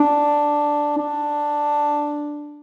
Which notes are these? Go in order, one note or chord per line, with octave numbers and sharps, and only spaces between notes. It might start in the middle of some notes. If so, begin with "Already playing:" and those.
Already playing: D4
D4